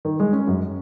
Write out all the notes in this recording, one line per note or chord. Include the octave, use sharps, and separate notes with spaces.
D#3
G#3
C#4
F#2